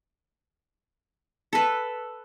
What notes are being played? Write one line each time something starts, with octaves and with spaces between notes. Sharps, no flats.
A4 B4